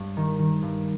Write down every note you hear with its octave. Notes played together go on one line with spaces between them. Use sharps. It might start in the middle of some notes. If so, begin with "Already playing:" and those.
Already playing: G2
D#3
D#3
G2